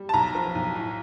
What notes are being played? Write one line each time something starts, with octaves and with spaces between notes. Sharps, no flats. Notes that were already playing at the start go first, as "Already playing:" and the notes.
Already playing: G3
A5
B1 A#5
F3
B1
A2